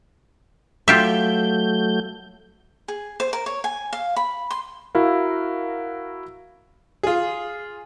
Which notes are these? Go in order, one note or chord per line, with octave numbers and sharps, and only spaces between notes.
F#3 A3 F4 G4 E5 G6
G#4
C5
A#4
C#5
G#5
F5
B5
C6
E4 F#4 A#4 F5
F4 G#4